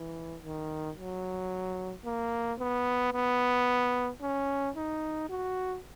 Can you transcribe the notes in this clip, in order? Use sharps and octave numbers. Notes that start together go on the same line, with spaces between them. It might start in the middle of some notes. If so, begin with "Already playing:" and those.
Already playing: E3
D#3
F#3
A#3
B3
B3
C#4
D#4
F#4